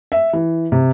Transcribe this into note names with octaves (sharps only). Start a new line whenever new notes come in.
E5
E3
C3